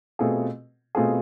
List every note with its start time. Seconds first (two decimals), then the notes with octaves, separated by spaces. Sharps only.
0.19 B2 A3 C4 F4 G#4
0.95 B2 A3 C4 F4 G#4